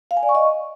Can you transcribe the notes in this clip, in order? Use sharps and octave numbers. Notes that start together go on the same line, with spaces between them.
F5
G#5
D5
C#6
D#5